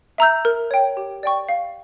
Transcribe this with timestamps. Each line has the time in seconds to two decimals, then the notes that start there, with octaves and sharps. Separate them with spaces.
0.18 E5 A#5 E6 G6
0.45 A#4
0.71 C#5 G5
0.97 G4
1.23 D5 G5 C#6
1.49 F5